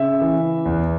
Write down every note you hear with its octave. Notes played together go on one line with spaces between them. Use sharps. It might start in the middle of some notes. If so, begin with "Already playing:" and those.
Already playing: C#3 E5
E3
E2